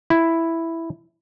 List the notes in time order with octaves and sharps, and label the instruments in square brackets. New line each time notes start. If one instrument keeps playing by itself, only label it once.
[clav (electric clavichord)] E4